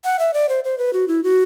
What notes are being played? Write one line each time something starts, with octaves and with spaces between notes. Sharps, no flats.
F#5
E5
D5
C5
C5
B4
F#4
E4
F#4